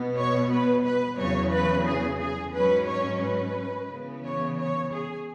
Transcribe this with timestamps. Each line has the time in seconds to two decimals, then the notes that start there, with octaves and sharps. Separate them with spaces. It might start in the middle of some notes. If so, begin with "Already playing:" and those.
Already playing: B2 B3
0.18 C#5
0.52 B4
0.85 B4
1.19 E2 C#3 F#3 C#5
1.53 B4
1.87 G#4
2.21 G#4
2.54 G#2 F#3 C#4 B4
2.89 C#5
3.22 B4
3.89 C#3 E3 B3
4.24 C#5
4.57 C#5
4.91 G#4